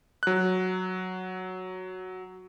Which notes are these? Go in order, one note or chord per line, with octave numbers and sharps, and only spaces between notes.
F#3 F#6